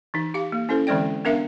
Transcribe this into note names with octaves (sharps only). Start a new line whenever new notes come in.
E3 D#4
G4 F5
A#3
C#4 E4 A4 C5
D3 E3 G#3 C4 D5 G5
B3 D4 A#4 E5 F5